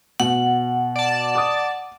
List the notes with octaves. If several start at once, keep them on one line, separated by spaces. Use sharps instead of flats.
B2 F#5
D5 A5
D6 D#6